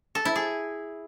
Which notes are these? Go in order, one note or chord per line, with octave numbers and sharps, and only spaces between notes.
A4
E4
G#4